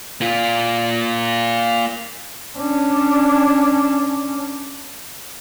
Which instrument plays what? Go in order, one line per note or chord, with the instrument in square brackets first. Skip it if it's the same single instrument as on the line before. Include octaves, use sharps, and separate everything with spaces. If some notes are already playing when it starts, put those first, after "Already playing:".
[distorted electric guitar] A#3 F4
[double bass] C#4 D4